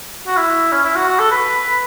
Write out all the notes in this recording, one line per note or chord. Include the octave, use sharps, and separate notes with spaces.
F#4
E4
C#4
E4
F#4
F#4
A4
B4